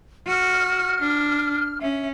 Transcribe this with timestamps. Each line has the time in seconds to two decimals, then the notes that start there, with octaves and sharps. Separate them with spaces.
0.27 F#4 F6
1.01 D4
1.81 C#4 E5